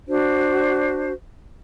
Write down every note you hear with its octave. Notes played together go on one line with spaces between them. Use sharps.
D4 F#4 C5